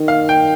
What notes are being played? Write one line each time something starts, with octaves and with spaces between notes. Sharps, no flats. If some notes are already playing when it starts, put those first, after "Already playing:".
Already playing: D#3
F5
G5